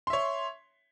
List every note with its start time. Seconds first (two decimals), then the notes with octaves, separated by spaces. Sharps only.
0.07 C6
0.10 E5
0.13 C#5